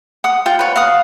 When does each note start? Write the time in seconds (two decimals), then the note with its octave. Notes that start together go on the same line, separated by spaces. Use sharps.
0.24 F#5 D#6
0.46 F4 G5
0.59 B4 C#5
0.76 F5 F#5 D#6